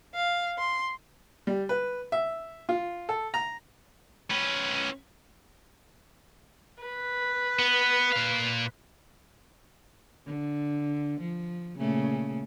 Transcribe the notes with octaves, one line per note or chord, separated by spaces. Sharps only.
F5
C6
G3
B4
E5
F4
A4
A#5
C#4 B4
B4
B3
A#2 F5
D3
F3
A#2 C#3 A3